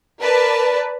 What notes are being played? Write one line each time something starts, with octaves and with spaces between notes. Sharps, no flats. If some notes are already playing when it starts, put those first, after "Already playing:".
A#4 B4 D5 A5